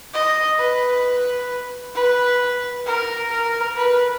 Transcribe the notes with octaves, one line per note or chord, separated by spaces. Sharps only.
D#5
B4
B4
A#4
A#4
B4